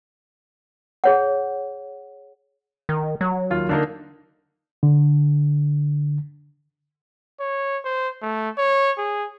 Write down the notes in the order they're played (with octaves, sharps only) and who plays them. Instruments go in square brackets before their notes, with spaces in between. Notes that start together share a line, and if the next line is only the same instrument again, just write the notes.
[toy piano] G#4 C#5 F#5
[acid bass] D#3
F#3
[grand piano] D#2 F4
D3 A#3 D#4
[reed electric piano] D3
[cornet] C#5
C5
A3
C#5
G#4